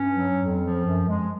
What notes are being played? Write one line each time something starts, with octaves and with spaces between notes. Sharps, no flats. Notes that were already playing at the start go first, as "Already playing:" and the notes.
Already playing: G2 C#4
F#3
F2
F3
F#2
G#3